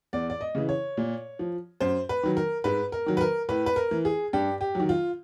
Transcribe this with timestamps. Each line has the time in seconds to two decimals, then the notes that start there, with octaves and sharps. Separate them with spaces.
0.13 E2 D5
0.30 D5
0.41 D#5
0.55 C#3 E3
0.69 C#5
0.97 A#2
1.39 F3
1.80 F#2 C5
2.09 B4
2.23 D#3 F#3
2.37 A#4
2.64 G#2 B4
2.92 A#4
3.06 D#3 F#3
3.17 B4
3.21 A#4
3.49 A2 B4
3.66 B4
3.76 A#4
3.91 E3
4.05 G#4
4.33 G2 G4
4.61 G4
4.75 D#3 F#3
4.89 F4